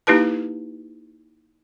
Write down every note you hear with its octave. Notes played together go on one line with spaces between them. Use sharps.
A#3 D#4 E4 G4 B4 A5